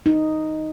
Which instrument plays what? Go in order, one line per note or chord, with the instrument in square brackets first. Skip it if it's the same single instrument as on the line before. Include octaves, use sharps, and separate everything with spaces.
[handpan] D#4